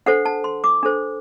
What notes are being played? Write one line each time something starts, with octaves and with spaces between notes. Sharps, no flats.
D4 A4 C5 F#5
A5
C6
D6
D4 A4 C5